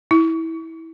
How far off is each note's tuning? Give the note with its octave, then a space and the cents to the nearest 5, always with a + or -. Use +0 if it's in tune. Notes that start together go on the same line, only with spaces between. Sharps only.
E4 -20